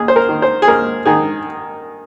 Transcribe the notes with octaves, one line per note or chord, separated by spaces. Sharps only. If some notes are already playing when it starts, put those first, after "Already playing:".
Already playing: D#2 G#4
C5
A#4
D#3
C5
G#4
D#2 A#4
D#3 G#4